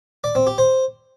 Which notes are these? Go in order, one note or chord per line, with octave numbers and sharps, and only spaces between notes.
D5
C4
G4
C5